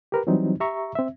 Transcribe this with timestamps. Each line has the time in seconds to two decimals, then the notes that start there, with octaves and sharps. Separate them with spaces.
0.12 G4 A#4 B4
0.27 E3 F#3 G3 C4 D#4
0.60 G4 E5 A#5 C#6
0.95 C4 E5